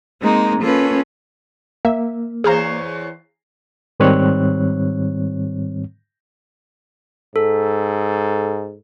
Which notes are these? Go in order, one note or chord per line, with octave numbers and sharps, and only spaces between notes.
G#3 A#3 C4 D#4
A#3 C#4 F4 A4 B4
A#3 E5
E2 G#4 C5 C#5 F5 A#5
G#2 D#3 G3 C4 C#5 F#6
G#2 A4